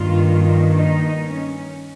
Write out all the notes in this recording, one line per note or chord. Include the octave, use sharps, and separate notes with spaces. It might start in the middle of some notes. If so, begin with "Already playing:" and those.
Already playing: G2 D#3 A#3 F4
D#4
C#4